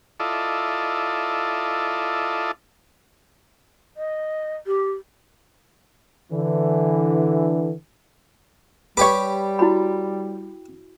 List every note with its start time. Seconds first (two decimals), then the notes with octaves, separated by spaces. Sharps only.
0.20 E4 F4 A4 D5 D#5
3.97 D#5
4.67 G4
6.32 D3 E3
8.97 G3 G4 B4 C#5 D6
9.59 E4 F#4 B5